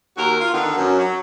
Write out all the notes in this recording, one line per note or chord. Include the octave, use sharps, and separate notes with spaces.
D#2 F#4 A#4
F4
D3 D#3 B3
F#2
F#3